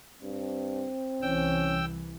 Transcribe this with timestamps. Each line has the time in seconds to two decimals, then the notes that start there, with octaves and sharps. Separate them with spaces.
0.23 G2 C4
1.22 C2 E3 C#4 G5 E6